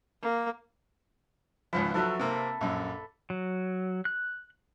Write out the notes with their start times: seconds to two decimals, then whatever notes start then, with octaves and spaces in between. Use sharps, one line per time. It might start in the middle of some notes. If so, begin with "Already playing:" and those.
0.22 A#3
1.73 G#1 C#2 F3 B4
1.94 F3 F#3 F#4 A4 E5
2.20 C3 A#3 C4
2.61 A#1 F#2
3.30 F#3
4.05 F#6